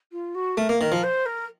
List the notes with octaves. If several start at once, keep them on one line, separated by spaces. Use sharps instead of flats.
F4
F#4
A3 A#4
A#3
D#3 A#4
F3
C5
A#4